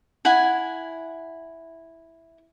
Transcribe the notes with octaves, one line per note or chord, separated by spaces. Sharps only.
E4 F#5 G#5